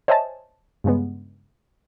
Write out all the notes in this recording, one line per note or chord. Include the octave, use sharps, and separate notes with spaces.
C5 C#5 D#5 E5 G#5 A5
G2 C#3 G#3 B3